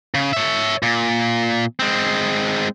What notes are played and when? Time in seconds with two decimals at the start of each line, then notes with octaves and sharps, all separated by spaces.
0.14 C#3
0.33 C#5 E5
0.83 A#2
1.80 G#3 C4